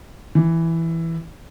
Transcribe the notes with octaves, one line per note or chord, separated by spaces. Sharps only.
E3